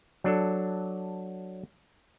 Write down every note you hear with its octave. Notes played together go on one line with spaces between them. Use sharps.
F#3 D4 A4